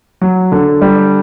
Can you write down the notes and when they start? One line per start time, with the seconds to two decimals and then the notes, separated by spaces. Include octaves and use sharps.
0.21 F#3
0.52 D3
0.82 G3